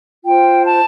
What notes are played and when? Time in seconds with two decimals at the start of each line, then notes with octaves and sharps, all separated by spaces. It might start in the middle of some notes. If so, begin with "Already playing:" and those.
0.25 F4 C5 G5
0.64 A5